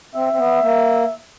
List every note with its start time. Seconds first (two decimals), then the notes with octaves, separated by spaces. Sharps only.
0.15 C4 E5
0.33 C4
0.38 B3
0.62 A#3